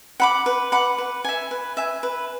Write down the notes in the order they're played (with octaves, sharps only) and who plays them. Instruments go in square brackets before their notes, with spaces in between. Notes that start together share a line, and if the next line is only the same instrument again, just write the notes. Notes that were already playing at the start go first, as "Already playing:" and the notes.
[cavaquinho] F#5 B5 D6
B4
F#5 B5 D6
B4
E5 G#5
B4
E5 G#5
B4